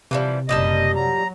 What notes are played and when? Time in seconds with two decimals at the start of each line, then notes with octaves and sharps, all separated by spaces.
0.11 C3 E3 F3 G3
0.49 F#1 A#2 G3 D#5 A5
0.96 F#3 A#5